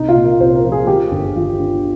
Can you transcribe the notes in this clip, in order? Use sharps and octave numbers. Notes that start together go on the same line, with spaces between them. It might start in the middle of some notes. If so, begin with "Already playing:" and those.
Already playing: C2 D#4
F4
A#2
A#4
C2 C5
A#4
F3
G#4
D#3 G4
G1
D#3 F4
G2